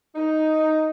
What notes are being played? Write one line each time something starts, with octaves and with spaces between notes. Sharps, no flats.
D#4